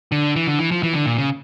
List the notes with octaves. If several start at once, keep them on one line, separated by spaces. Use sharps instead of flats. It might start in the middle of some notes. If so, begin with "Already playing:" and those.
D3
E3
D3
E3
F3
E3
D3
A#2
C#3